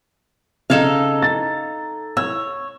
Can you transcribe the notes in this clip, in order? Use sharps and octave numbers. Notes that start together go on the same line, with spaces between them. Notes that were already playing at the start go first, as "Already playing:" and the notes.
C#3 D#4 A4 F5 G#6 E7
A6
C#5 E6